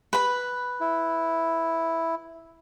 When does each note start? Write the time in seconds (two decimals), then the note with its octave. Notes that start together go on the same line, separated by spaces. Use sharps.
0.13 B4 B5
0.80 E4